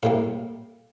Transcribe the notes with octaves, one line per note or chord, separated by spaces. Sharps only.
A2 G3 A#3 F5